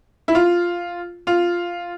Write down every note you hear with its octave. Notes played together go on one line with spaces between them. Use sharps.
E4
F4
F4